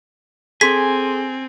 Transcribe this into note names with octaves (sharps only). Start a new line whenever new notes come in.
C4 G#4 A4 G#5 C6 B6